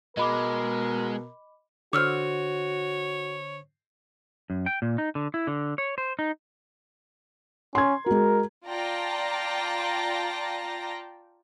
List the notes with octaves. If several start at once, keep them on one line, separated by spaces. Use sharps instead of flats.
B2 G#3 A#4 D#5 B5 D6
D3 F#4 C5 C#5 D6 E6 F6
F#2
G5
A#2
D#4
D3
E4
D3
C#5
C5
D#4
C#4 C6 G#6
G#3 F#4 A#4
F4 D5 G5 A5 A#5 A#6